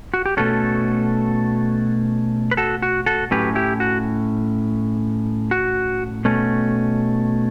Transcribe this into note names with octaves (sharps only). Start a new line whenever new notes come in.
F#4
G4
B2 A3 C#4 F#4 A4
B4
F#4 A4
F#4
F#4 A4
A2 F#3 C#4 G4 B4
E4 G4
F#4
F#4
B2 A3 C#4